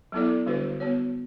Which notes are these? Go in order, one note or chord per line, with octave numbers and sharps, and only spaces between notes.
F#3 B3 E4 A4 D5
D3 G3 D4 F#4 B4
B3 F#4 C#5